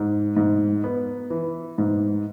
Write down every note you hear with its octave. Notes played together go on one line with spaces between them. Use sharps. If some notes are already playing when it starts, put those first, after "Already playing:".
Already playing: G#2
G#2
B3
E3
G#2